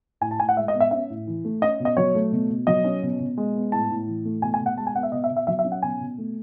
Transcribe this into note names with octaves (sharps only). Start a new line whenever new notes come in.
A2 G#5
A5
A2 G#5
F#5
G#3 E5
D#5
B3
E5
C#4 E5
A2
E3
A3
C#4 D#5
B2
D#5
F#3 C#5
A3
B2
B2
F#3 D#5
C#4
B2
B2
G#3
B3
A2 A5
A2
E3
A3
B2 G#5
G#5
B2
F#5
G#3 A5
G#5
B3 F#5
E5
B2 D#5
E5
B2
E5
F#3 E5
E5
C#4
F#5
B2 G#5
B2
A3